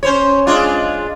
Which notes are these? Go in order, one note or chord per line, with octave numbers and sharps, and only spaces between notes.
C#4 C5 C#5
G#3 D4 F4